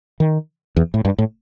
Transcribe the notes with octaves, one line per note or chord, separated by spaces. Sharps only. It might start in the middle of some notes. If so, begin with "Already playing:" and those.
D#3
E2
A2
G2
A2